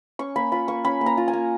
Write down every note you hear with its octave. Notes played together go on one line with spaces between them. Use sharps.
C#4 C#6
A#3 B5
F4 B5
A#3 C#6
C#4 B5
A#3
A#5
F4
G#5
A#3